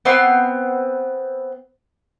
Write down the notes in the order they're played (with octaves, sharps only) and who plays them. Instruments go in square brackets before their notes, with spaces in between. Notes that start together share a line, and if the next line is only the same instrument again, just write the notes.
[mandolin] B3 C4 C6